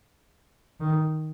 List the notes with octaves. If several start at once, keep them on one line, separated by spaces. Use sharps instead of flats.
D#3